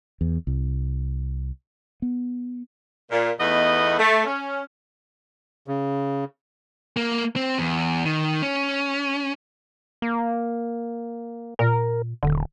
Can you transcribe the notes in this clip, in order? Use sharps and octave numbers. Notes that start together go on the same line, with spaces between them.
E2
C2
B3
A#2
E2 A3 B3 D#4 D#5
A3
C#4
C#3
A#3
C4
E2
D#3
C#4
A#3
A#2 A#4
D#1 D3